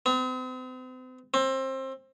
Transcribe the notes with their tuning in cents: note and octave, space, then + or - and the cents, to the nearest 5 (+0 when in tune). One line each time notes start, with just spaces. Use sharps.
C4 -40
C4 +25